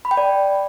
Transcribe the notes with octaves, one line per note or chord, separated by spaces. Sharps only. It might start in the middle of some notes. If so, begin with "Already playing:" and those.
B5
G5
D5